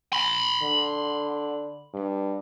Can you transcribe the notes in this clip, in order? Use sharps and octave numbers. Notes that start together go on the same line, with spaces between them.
B5 C6
D3
G2